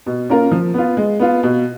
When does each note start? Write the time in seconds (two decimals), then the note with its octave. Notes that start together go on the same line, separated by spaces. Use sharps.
0.06 B2
0.30 A#3 C#4 F4 A#4
0.51 F3
0.74 B3 F4
0.97 G#3
1.19 B3 F4
1.43 B2